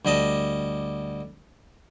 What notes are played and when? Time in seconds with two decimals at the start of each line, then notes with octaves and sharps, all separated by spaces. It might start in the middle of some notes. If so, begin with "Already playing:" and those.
0.05 D2 G3 D#5 A5